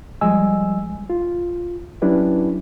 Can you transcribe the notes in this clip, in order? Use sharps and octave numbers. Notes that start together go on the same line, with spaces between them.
F3 G3 G#3 D#5 G#5 E6
F4
F#3 C#4 D4 E4 G4 B4